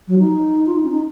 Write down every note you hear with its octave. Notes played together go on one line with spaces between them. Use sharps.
F#3
D#4
F4
D#4
C#4
D#4